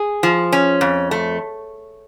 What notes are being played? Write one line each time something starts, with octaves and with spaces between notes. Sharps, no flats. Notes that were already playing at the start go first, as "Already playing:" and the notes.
Already playing: G#4
F3
C#4
F2
A3